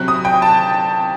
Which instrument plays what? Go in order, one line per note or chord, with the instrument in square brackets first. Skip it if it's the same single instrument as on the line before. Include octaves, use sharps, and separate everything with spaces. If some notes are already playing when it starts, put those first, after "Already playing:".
Already playing: [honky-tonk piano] C3 F#3 C4 F#6
D#6
G5
A5